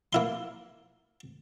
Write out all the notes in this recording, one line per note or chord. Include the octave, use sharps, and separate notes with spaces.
A#3 E4 C6